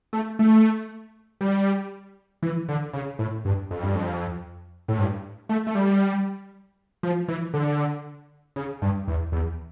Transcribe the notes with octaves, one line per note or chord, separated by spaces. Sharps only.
A3
A3
G3
E3
D3
C#3
A2
G2
F2
G2
F2
A2
G2
A3
A3
G3
F3
E3
D3
C#3
G2
E2
E2